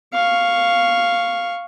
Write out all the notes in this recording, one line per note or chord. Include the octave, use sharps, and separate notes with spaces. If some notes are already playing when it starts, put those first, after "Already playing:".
F5 C#6